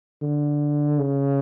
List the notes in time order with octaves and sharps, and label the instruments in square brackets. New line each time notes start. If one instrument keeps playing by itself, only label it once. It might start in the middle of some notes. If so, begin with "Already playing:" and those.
[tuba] D3
C#3